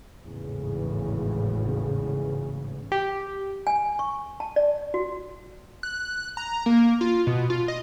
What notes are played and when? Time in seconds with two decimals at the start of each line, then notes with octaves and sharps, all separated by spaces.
0.24 G#1 E2 A2 C#3
2.92 G4
3.67 G#5
3.99 C#6
4.40 A5
4.56 D5
4.94 F#4
5.83 F#6
6.37 A#5
6.66 A#3
7.01 F4
7.27 B2
7.50 F4
7.68 D#5